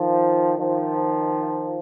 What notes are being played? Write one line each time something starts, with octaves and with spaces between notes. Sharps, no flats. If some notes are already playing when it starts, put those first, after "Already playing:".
Already playing: D#3 F3
D#3 F3